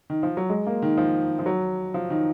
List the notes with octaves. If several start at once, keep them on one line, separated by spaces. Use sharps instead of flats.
D#3
F3
F#3
G#3
A#3
D#3
F3
F3
F#3
F3
D#3